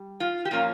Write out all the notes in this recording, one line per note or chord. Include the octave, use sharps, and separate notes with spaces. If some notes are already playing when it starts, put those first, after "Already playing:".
Already playing: G3
F4
G4
A#2 F3 A#3 C#4 F4